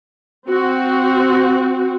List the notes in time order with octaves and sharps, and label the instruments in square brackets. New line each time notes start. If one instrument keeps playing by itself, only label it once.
[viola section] C4 F#4